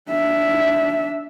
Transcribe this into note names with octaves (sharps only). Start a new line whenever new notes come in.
D4 E5